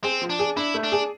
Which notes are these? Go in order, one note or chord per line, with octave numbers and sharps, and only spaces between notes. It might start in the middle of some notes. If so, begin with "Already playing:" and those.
C4 G#4
F3
D4
G#4
D4 E4
A3
D4
G#4